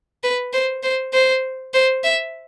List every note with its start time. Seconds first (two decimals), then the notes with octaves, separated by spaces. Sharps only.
0.24 B4
0.53 C5
0.83 C5
1.13 C5
1.74 C5
2.04 E5